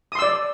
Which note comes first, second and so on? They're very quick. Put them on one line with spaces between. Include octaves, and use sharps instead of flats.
D#6 C6 E6 D5